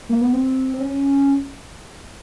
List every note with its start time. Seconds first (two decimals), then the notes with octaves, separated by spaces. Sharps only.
0.09 A#3
0.21 B3
0.33 C4
0.74 C4
0.80 C#4